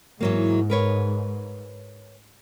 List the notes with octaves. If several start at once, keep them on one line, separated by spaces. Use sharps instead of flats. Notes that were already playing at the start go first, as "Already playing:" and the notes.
G#2 E3 F#3 A#3
A#4 B4 C#5